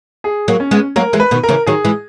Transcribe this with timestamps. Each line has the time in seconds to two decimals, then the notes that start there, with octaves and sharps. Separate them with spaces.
0.24 G#4
0.48 F#3 A#3
0.60 C#4
0.71 G#3 B3
0.96 F#3 A#3 A#4
1.13 E3 G#3
1.20 B4
1.31 B2 D#3
1.43 A#4
1.49 C#3 E3
1.66 D#3 F#3 G#4
1.85 E3 G#3